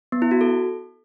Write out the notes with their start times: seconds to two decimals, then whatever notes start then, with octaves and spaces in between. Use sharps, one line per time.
0.12 B3
0.22 E4
0.31 F#4
0.41 A4